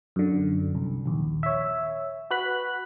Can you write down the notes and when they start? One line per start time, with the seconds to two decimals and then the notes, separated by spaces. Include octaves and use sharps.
0.16 F#2 D3
0.75 C2
1.06 A#1 D#2
1.43 C#5 E5
2.30 F#4 B4 F#6 B6